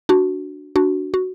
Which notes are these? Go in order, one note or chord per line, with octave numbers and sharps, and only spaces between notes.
D4 F#4
D4 F#4
F#4